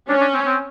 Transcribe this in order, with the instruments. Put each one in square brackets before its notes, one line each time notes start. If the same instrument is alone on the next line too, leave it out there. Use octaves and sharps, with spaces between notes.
[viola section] C#4 [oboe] D4
[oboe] D4
C4
C4